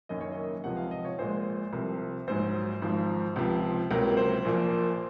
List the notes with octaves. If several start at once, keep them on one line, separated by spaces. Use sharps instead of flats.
F#1 F#2 D#3 A#3 C#4 D#5
C#5
D#5
C#2 C3 F3 F#5
F5
D#5
C#5
A#1 A#2 G#3 C5
C2 C3 F3
A#1 G#2 F#3 C5
G#1 G#2 F3
C#2 C3 F3
C#2 C3 F#3 A#3 A#4
C5
A#1 A#2 F3 A#3